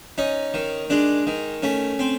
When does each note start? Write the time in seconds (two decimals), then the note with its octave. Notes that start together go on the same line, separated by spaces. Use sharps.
0.18 C#4 D#4
0.54 D#3
0.90 G#3 D4
1.27 D#3
1.62 A3 C#4
1.99 C4